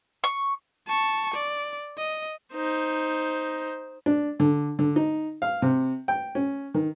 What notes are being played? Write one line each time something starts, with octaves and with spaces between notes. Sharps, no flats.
C#6
A5 C#6
D5
D#5
D#4 C5
D4
D3
D3
D#4
F5
C3
G5
C#4
D#3